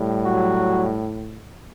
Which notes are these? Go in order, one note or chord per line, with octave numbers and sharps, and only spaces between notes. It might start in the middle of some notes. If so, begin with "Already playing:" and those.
Already playing: A2 G3
F#3 F#4